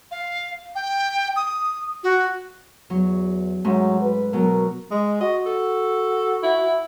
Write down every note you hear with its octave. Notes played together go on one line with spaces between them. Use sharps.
F5
G5
D#6
F#4
E2 F#3
G#2 F#3 A3 C#4
B4
B2 F#3 A#4
G#3 D#5
F#4 D#5
A4
E4